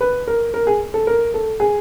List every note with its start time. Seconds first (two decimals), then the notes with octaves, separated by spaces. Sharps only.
0.01 B4
0.28 A#4
0.54 A#4
0.67 G#4
0.94 A4
1.07 A#4
1.34 A4
1.60 G#4